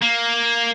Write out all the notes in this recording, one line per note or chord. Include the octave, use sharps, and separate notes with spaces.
A#3